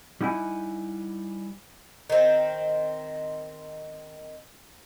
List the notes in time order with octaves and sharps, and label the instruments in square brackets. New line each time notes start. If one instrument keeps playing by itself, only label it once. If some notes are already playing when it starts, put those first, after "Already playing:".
[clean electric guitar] G3 D#4 E4 F#5 G#5
[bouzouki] D#3 C4